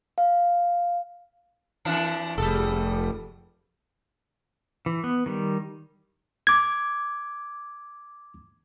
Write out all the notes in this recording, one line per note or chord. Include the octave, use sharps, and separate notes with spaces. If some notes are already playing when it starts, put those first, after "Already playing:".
F5
F2 E3 D4
F1 G3 G#4 A4
E3
B3
D#3 G3
D6 G#6